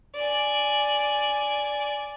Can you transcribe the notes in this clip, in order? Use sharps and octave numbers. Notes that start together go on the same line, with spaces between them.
D5 G#5